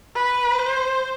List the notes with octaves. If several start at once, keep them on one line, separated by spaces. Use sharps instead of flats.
B4
C5